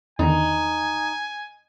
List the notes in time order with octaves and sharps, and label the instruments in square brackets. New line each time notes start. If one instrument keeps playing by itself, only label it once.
[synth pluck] E2 D3 D#3 [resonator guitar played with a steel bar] D#4 [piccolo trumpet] G#5